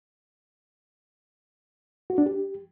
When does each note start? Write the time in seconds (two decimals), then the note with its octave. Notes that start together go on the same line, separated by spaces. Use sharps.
2.10 F#4
2.18 D4
2.26 G4